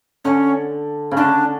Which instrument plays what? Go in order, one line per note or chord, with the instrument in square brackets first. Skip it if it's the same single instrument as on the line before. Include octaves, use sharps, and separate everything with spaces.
[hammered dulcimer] D3 [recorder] C#4
[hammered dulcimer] C#3
[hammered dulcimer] D3 [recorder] D4